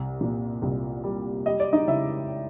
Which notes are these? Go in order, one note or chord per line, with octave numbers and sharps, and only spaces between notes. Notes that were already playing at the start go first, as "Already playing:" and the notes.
Already playing: C2
A#2
C2
G3
G3 D#5
D5
D#4 D#5
C#3 E4 E5